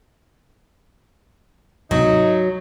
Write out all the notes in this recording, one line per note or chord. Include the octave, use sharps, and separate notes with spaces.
D2 G#2 C3 F#3 D#4